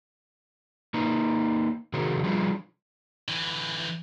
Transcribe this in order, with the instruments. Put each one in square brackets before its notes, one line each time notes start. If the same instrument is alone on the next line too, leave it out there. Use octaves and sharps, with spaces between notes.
[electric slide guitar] A#3 D#4 B4
C3 D#3 F#4 G#4 A#4 C5
F3 G3 D4 F4 G#4 B4
[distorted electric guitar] D3 E3